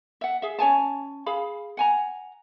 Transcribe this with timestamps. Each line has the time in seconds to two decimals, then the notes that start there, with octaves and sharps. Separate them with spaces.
0.21 E5 F#5
0.42 G#4 E5
0.59 C#4 C#5 G#5 A5
1.26 G#4 F5 B5
1.77 F#5 G#5 A#5